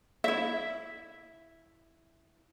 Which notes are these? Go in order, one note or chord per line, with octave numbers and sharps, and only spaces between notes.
E4 E5